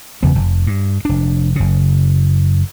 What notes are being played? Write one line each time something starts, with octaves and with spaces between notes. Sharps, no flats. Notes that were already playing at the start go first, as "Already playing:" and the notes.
F#1 E2 C#3 B3
F1
G2
F1 D4
F#1 C#3